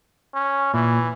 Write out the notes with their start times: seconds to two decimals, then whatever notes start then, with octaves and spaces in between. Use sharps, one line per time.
0.34 C#4
0.74 A#2 E3